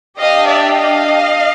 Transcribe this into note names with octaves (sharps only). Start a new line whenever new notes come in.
D4 G4 D#5 F5
D5 E5
D#5 F5